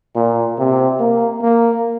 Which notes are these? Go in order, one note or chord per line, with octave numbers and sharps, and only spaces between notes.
A#2
C3
A#3
A#3